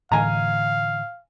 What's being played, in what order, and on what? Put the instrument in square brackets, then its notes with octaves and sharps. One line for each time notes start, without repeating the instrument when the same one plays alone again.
[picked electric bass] A2 D3 E3 [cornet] F5 [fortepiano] G#5 A#5